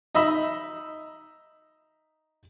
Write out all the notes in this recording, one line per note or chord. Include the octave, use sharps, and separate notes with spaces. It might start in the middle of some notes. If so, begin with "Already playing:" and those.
D#4 D#5 E5 B5